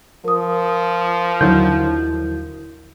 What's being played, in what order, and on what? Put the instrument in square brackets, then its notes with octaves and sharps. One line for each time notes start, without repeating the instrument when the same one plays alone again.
[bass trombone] F3 [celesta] A#4 D#6
[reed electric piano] D#2 E4 G6 [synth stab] D3 D#3 F#3